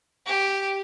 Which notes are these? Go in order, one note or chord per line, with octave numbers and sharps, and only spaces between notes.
G4